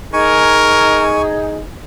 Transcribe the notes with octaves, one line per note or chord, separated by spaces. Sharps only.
D#4 G#4 A#4 G#5 C#6